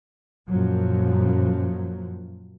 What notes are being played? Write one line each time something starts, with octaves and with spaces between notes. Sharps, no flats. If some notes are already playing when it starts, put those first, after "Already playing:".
F#2 A#2 F3 F#3